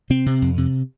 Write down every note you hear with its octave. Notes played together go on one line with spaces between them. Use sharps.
C3 C4
C3
F2
C3